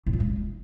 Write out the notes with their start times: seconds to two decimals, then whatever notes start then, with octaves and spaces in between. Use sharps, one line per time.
0.06 A2
0.13 A#2
0.20 G#3